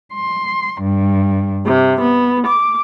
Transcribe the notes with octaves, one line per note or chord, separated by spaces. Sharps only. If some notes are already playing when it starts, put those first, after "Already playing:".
C6
G2
C3
B3
D6